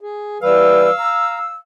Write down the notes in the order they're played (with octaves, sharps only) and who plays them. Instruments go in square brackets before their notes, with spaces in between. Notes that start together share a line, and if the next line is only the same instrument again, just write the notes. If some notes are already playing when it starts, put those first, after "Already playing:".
[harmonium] G#4
[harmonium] E3 G3 B4 [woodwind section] F5 E6
[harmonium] A#5